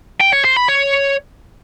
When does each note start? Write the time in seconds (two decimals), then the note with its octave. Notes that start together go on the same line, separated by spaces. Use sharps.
0.21 G5
0.33 C#5
0.45 C5
0.57 B5
0.69 C#5